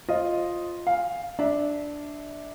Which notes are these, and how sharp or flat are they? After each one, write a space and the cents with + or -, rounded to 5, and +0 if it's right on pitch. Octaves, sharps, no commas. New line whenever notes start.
F4 +0 C5 +40 D#5 +0
F5 +0 G#5 -15
D4 +0 E5 -20